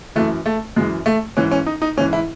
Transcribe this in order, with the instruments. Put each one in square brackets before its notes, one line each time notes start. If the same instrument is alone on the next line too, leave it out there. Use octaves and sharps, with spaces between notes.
[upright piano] F#2 E3 A3
A3
F#2 E3 G#3
A3
G#2 E3 C#4
C#4
D#4
D#4
G#2 E3 C#4
E4